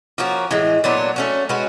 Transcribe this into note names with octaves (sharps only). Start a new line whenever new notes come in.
F3 A#3 C#4 F#4
A2 E3 G#3
A#2 F#3 B3 D4
A3 C#4 F#4
G#3 C#4 F#4 B4